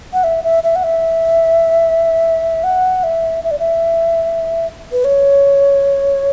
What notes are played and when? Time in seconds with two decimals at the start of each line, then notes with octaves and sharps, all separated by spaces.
0.13 F#5
0.24 E5
0.44 E5
0.64 E5
0.76 F#5
0.84 E5
2.64 F#5
3.04 E5
3.44 E5
3.51 D5
3.59 E5
4.92 B4
5.04 C#5